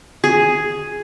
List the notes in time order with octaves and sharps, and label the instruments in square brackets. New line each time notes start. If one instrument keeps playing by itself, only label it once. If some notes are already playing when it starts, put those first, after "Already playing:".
[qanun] G#4